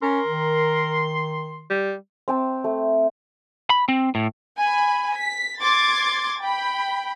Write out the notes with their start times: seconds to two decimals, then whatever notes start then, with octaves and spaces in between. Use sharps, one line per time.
0.02 C#4 A#4 C6
0.27 D#3
1.70 G3
2.28 C4 G5 A5
2.64 A3
3.70 B5
3.88 C4
4.15 A2
4.58 G#5 B5
5.14 B6
5.61 C6 D6 G#6 A6
6.40 G5 B5